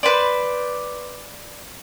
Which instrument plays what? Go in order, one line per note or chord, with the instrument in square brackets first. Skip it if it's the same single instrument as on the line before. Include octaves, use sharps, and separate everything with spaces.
[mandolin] B4 C5 D5